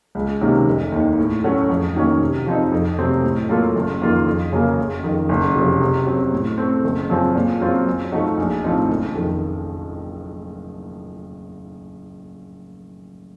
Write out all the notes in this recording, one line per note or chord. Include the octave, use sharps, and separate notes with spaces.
C#2
C3 D#3 A#3 C#4
F1
D#2 D#3
A2
F#3 A3 C#4 F#4
F2
D#3 F#3 A#3 C#4
C3
F3 C4 D#4
F2
C3 F#3 A3 C4
A2
F#3 A#3 F4 A4
F#1
F2 D#3 A#3 F4
F2
C#3 F#3 A#3
F#1
F2 D#3
F#1
F2 C3 F#3
C3
F#3 C4
A2
A3 C4
F#1
F#2 F3 C4
A#2
F#3 C4 F4
F#2
F3 A3 D#4 F#4
A#1
A2 F3 C4 D#4
F#1
F2 D#3